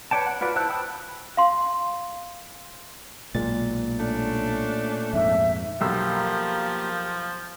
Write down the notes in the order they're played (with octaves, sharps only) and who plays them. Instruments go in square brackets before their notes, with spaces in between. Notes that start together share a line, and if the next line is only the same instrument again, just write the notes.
[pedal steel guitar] B4 C#5 D5 G5 A5
F#5
F4 F#4 B4 D5
E4 C5 A5 E6 F#6
G5 A5 B5 D#6 E6
[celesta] F5 C6
[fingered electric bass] B1 G#3 [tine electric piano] A#2 A6
[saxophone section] A3 C#4 D4
[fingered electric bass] F2 G#2 [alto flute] E5
[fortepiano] B1 E6 [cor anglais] F3 [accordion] A#3 G4